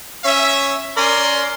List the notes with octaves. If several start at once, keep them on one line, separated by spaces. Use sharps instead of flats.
C#4 E5
C#4 A#4 D5 C6